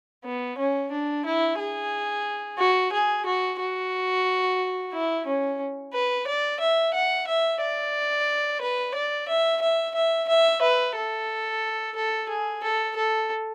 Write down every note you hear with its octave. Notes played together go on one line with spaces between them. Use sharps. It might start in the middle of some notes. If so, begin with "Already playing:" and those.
B3
C#4
D4
E4
G#4
F#4
G#4
F#4
F#4
E4
C#4
B4
D5
E5
F#5
E5
D5
B4
D5
E5
E5
E5
E5
B4
A4
A4
G#4
A4
A4